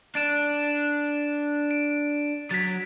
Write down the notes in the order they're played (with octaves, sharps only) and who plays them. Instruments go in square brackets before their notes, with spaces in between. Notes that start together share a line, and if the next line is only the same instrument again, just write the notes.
[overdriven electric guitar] D4 [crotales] A6 D7 E7
[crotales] D7
[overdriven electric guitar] F#3 [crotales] A6 B6